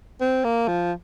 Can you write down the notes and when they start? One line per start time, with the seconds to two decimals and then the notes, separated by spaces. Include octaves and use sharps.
0.21 C4
0.44 A#3
0.68 F3